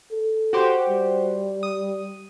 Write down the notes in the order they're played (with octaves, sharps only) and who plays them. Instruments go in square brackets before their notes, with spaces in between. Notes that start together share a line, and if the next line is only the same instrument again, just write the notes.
[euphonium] A4
[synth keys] F#4 G4 C5
[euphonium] G3
[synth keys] D#6